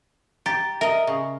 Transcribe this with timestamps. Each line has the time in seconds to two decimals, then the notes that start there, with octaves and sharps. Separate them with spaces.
0.46 G4 A#5 A6
0.81 A#4 D#5 E5
1.07 C#3